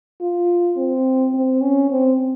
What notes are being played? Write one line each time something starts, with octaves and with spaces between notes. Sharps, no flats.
F4
C4
C4
C#4
C4